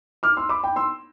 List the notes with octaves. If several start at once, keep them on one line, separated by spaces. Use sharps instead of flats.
D6 F6
C6 E6
B5 D6
G5 B5
C6 E6